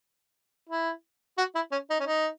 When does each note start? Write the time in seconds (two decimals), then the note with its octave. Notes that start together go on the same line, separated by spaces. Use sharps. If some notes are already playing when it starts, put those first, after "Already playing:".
0.69 E4
1.38 F#4
1.55 E4
1.72 C#4
1.90 D#4
2.00 C#4
2.06 D#4